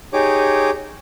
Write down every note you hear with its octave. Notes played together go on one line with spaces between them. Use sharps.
D#4 G4 G#4 C#5 D6